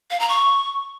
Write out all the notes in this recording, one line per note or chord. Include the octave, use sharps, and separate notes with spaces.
F5
A#5
C#6